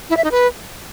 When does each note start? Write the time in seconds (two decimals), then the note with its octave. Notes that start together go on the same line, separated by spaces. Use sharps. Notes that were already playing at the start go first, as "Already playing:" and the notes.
0.10 E4
0.17 E5
0.24 D#4
0.31 B4